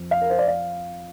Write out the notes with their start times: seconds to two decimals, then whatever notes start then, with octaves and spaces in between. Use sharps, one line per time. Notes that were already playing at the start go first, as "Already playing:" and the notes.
Already playing: F2 F3
0.11 F5
0.21 A#4
0.30 C5
0.39 D5
0.48 F5